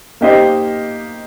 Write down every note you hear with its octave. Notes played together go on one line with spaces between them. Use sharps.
A#3 D#4 G4 C5 D#5